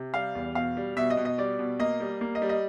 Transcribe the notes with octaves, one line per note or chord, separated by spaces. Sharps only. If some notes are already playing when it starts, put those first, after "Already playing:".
Already playing: C3
G3 F5
E2
B2 F5
G3
B2 E5
D#5
B2
D#5
G3 D5
B2
A#3 D#5
G3
A#3
D#5
G3
D#5